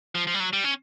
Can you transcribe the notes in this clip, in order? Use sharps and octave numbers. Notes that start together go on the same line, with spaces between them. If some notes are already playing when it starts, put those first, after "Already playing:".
F3
F3
G3
F#3
G3
C#4